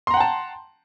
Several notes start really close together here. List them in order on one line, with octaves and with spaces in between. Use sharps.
C6 A#5 F#5 G5 A5